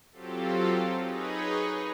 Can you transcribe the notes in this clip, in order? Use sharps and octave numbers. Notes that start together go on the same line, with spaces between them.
F#3 C4 F4 G4 A4
D#4 G#4 B4 C#5 D#5